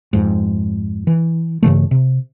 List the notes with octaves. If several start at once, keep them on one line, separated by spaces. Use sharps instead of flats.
F2 G#2
E3
G2 C#3 E3 A3
C3